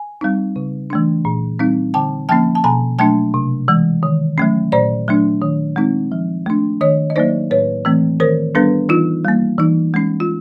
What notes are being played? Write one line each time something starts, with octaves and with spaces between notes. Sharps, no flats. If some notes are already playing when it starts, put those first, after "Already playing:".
Already playing: G#5
G3 C4 D#4
C#3
E3 A3 D4
A#2
G3 C4 D#4
D3 G5 A5
F3 A#3 C#4 G5 A5
A5
B2 G#5 A#5
F#3 A3 D4 G5 A5
C3
E3 G#3
D#3
F#3 A3 C#4
A#2 C5 D5
F#3 A3 D4
D#3
G#3 C4 D#4
F3
A3 D4
D#3 C#5 D#5
D#5
F#3 A#3 D#4 C5 D5
A2 B4 C#5
E3 A3 C4
D#3 A#4 C5
G3 B3 D4 A4 B4
E3 D#4 F4
G3 A#3
E3 D#4
G#3 C#4
F4